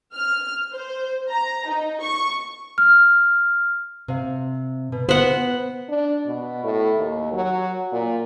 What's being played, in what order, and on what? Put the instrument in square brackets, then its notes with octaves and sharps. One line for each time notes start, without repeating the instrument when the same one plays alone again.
[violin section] F6
C5
A#5
D#4
C#6
[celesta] F6
[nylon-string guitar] C3 F5
B2
[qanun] B3 F#5 [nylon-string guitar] C5
[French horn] D4
B2
A2
D#2
F#3
A#2